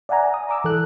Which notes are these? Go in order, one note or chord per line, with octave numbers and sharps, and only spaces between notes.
D5 E5 F#5 G#5 A#5
D#6
A#5 D6 E6
E3 A4 F#6